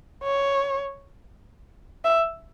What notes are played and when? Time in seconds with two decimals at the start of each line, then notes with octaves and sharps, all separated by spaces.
0.23 C#5
2.05 E5